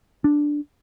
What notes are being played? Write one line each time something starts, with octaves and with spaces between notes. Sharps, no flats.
D4